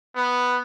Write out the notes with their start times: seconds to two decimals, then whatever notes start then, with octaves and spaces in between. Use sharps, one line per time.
0.16 B3